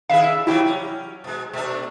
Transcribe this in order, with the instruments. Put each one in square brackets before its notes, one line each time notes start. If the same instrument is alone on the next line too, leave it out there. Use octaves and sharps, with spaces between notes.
[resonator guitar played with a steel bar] D3 B4 E5 [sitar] D#3 E4 G#4 [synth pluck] F5
[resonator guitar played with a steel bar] E5
[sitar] C3 E3 G3 [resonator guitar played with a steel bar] F#3 G4 G5 [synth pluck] E4
[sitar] C#4
B2 G#3
[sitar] B2 D4 [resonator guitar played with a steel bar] A3